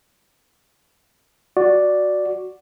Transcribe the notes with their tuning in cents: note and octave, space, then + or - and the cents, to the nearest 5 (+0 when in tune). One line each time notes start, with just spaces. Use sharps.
F#4 -5 D5 +0